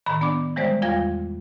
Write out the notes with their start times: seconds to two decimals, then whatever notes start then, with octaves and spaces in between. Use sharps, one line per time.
0.06 A2 D#3 A#5 B5
0.21 B3 D4 D5 B5 D6
0.56 E3 G3 G#3 C5 D5
0.82 E2 G3 F4 F5 G#6 A#6